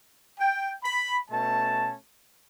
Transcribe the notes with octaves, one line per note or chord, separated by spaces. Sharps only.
G5
B5
B2 A3 C#4 A5